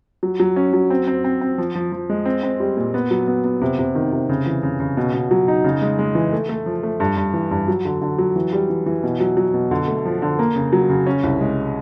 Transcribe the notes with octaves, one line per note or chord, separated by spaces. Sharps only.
F#3
F#3
C#4
F#3
C4
C4
C4
C4
F3
F3
F3
G#3
C4
C4
G3
A#2
B3
F#3
B3
B3
C3
C3
D#3
C3
C#3
E3
C#3
C#3
B2
B2
F#3
D#4
C#3
G#3
G#3
E3
A3
A3
F3
A3
G2
G2
E3
G2
F#3
D3
D3
F#3
E3
G3
E3
E3
B2
F#3
F#3
B2
D3
A3
F3
D3
A#3
C#3
F#3
C#3
C#4
C2
G#3